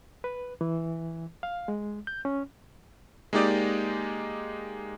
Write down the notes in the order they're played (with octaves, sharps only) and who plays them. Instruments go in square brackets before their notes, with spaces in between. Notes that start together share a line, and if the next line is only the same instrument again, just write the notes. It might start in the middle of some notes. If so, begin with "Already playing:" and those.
[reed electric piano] B4
E3
F5
G#3
G6
C#4
[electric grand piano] G#3 A#3 D#4 G4 D5 D#5